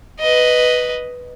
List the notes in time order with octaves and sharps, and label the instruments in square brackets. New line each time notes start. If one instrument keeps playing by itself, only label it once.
[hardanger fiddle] B4 D#5